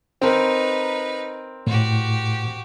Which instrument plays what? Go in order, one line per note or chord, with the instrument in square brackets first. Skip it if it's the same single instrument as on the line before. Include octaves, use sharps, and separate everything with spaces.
[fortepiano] C4 A#4 [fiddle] D#4 B4
[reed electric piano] A2 [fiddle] F#4 G4